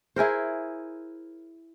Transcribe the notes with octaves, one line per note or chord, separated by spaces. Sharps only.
E4 G#4 A#4 C5